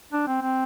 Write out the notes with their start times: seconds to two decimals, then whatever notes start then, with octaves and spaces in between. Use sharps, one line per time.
0.13 D4
0.27 C4
0.41 C4